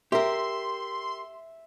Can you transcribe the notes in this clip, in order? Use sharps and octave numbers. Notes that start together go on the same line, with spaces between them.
G4 A#4 E5 C6